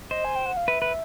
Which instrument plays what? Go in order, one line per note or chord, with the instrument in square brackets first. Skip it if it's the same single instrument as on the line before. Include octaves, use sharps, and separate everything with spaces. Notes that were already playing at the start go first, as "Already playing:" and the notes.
[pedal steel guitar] C5 [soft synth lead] D#5
[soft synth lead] G#5
G5
F#5
F5
[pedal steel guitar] B4 [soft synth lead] E5
[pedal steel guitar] B4